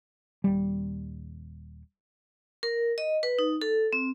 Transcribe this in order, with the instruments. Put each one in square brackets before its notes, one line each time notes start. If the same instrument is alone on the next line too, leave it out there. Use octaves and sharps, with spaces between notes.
[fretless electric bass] D#1 G3
[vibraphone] A#4
D#5
B4
D#4
A4
C4